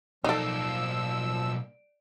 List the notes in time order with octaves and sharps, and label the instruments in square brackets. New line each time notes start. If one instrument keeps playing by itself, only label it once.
[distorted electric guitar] B1 A#3 [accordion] F3 E6 [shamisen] D#4 A4 [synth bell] D5 D7